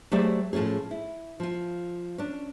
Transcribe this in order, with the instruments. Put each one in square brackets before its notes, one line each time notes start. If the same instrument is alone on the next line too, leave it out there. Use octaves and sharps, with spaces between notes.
[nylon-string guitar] F#3 A3 G4 G#4 C5 D5
A2 F3 A3 C#4 G#4
E4
F3 F4
C#4 D4